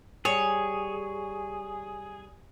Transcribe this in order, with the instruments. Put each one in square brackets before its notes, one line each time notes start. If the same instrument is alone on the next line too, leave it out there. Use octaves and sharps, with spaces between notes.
[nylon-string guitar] G3 [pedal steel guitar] G#4 [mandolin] C#5